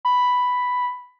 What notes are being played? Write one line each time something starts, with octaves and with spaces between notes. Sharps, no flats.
B5